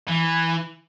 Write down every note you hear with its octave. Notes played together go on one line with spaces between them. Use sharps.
E3